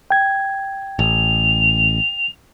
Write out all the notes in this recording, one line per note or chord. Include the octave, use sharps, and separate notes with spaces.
G5 G#6
A1 F7